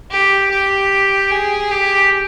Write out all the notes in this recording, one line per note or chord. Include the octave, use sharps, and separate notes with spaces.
G4
G4
G#4
G4